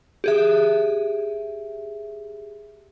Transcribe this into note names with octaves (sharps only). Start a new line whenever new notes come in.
G4 G#4 E5